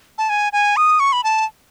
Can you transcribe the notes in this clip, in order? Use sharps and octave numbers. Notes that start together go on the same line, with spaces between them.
A5
G#5
G#5
D#6
C#6
B5
A5